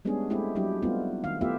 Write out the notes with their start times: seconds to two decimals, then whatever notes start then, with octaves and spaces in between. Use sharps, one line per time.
0.05 G3 G#3 B3 C#4 D4 G#4
0.30 G#3 A3 C4 E4 G4
0.55 F#3 G3 D4 E4 G4
0.82 G3 A3 B3 C4 D#4 F4
1.24 D#3 F5
1.41 A3 B3 E4 F4 G4 E5